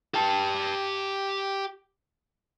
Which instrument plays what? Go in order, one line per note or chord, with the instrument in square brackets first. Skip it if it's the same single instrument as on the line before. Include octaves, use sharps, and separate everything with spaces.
[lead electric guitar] G4 A5